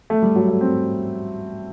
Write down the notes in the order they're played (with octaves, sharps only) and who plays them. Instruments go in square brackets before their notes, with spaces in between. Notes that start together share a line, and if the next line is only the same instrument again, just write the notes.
[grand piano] A3
G3
F#3
A3
C4